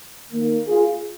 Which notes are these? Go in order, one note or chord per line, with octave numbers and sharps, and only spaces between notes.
D#3 A#3
F4 G#4